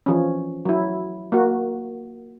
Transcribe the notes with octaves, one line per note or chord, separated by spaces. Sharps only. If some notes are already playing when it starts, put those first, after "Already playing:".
E3 F3 C#4
F#3 E4
A#3 F#4